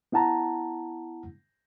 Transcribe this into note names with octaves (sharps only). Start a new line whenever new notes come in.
B3 E4 F#5 A5 A#5